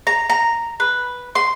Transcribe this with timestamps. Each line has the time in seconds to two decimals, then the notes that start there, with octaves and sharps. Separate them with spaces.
0.07 A#5
0.30 A#5
0.80 B4
1.35 C6